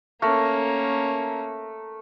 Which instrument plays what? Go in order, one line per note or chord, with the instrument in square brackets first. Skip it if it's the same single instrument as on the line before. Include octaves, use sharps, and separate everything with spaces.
[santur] A3 A#4 [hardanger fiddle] A#3 C#4